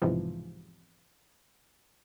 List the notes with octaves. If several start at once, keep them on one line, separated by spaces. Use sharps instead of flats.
B1 E2 G#2 C3 E3 F3